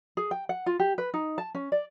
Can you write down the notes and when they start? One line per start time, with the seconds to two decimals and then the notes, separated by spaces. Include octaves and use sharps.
0.17 G#4
0.31 G5
0.49 F#5
0.66 F4
0.79 G4
0.98 B4
1.14 D#4
1.38 A5
1.55 C#4
1.72 D5